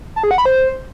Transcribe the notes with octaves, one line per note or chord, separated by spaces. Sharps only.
A5
G#4
F#5
B5
C5